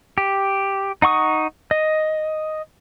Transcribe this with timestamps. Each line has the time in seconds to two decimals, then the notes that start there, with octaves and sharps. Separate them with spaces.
0.18 G4
1.02 D#4 F#5 C#6 D#6
1.71 D#5